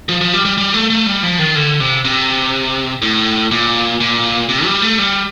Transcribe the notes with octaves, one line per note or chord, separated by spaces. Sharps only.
F3
F3
G3
G3
G3
A3
A3
G3
F3
D#3
D3
C3
C3
A2
A#2
A#2
C3
G3
A3
G3